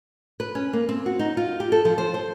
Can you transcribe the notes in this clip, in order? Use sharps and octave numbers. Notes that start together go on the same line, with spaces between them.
B4
C#4
A#3
C4
F#4
D#4
F4
G4
A4
F3
C5
C5